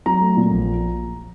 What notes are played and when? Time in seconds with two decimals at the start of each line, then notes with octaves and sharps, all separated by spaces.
0.06 F#3 A#5
0.21 A3
0.37 A#2
0.51 A#1